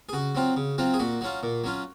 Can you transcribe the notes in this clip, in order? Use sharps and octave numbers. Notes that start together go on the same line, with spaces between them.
G#4
C#3 F#4
F#3 C4 F4
C#3
F#3 C4 F4
G#4
A#2 F#4
F#3 C#4 F4
A#2
F#3 C#4 F4